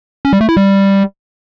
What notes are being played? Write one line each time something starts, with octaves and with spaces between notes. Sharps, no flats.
C#4
G3
A3
E4
G3